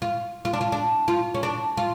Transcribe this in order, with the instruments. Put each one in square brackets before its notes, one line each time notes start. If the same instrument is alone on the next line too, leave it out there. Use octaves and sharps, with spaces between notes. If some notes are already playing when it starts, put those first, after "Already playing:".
[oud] F4
F4
D4
F4
D4
F4
C#4
D4
F4